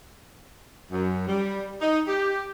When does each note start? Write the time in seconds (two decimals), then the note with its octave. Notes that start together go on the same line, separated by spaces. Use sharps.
0.91 F#2
1.27 G3
1.80 D#4
2.07 G4